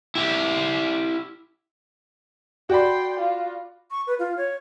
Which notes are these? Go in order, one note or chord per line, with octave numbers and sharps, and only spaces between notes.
E4 G4
F#4 D5 G5 B5 C6
F4
C#6
B4
F4
C#5